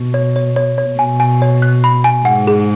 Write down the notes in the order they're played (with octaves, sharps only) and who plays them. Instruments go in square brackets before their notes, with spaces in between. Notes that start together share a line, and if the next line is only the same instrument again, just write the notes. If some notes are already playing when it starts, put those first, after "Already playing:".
Already playing: [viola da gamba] B2
[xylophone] C#5
C#5
C#5
C#5
[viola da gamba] B2 [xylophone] G#5
[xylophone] G#5
C#5
F#6
B5
G#5
[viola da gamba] G#2 [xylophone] F#5
[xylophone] G#4